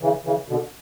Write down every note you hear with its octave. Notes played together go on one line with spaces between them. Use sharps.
C#3 E3
C#3 E3
B2 D3